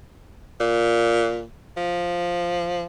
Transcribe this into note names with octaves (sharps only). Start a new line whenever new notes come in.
A#2
F3